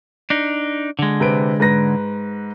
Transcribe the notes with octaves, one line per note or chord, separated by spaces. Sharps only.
D4 D#4
D3 G#3
C3 B4 D7
G#2 B4 A#6